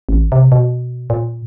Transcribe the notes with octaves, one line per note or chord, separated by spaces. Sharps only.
A1
C3
B2
A#2